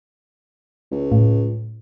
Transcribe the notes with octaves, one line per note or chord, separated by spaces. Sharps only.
C#2
A2